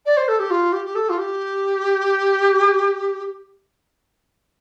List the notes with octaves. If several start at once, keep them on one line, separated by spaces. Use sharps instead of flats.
D5
C5
A4
G4
F4
G4
G4
A4
F4
G4